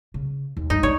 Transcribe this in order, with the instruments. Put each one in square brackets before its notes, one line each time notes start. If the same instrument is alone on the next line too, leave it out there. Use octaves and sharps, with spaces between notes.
[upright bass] C#3
D#2
[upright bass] G2 [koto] D#4
[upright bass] D4 [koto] C#5